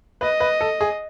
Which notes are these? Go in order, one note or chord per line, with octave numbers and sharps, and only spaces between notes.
B4 D#5
B4
A4
G#4